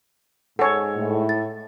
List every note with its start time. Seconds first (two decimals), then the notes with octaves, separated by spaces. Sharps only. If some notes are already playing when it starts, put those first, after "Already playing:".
0.59 G#2 A4 C#5 F#5 G#5
0.96 A2
1.29 A6